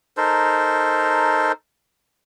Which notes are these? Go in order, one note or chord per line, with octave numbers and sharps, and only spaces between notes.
D#4 A4 A#4 C5